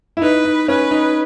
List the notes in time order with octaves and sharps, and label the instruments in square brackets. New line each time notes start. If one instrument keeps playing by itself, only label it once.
[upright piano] E4
[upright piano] D#4 [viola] B4
[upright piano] D#4
[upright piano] C#4 [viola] B4
[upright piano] D#4